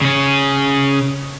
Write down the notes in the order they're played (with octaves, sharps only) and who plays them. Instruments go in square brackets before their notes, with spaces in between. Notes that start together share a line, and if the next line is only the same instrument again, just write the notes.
[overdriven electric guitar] C#3 C#4